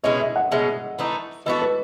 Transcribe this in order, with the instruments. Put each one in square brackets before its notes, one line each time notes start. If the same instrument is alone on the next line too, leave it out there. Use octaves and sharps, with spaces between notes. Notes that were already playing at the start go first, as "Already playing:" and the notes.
[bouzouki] B2 G#3 C#4 E4 [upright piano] D#5
[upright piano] E5
F#5
[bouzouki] B2 G#3 C#4 [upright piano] E5
[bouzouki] E3 A3 D#4
[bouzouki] E3 B3 F#4 A4 [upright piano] D#5
[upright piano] B4